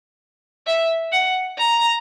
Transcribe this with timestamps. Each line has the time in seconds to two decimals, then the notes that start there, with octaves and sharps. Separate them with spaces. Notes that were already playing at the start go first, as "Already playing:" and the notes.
0.67 E5
1.12 F#5
1.57 A#5